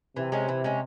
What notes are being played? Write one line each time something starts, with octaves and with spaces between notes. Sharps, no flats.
C3 E3
G#3 C#4
E3
G#3 C#4